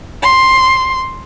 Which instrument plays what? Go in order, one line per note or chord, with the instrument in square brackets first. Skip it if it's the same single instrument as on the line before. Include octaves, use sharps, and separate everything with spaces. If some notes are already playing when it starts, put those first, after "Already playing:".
[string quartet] C6